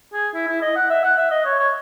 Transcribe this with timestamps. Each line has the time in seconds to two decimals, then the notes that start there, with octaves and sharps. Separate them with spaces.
0.13 G#4
0.34 E4
0.48 E4
0.62 D#5
0.76 F#5
0.90 E5
1.04 F#5
1.17 E5
1.31 D#5
1.45 C#5
1.59 C#5